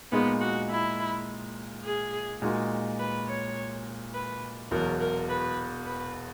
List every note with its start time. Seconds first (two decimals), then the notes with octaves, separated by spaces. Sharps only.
0.12 A#2 G#3 B3 D#4 G#4
0.41 F#4
0.70 E4
1.84 G#4
2.42 A#2 G#3 D#4 F#4
2.99 B4
3.28 C#5
4.14 B4
4.71 E1 E2 B2 F#3 A#4
5.00 A#4
5.29 B4
5.86 B4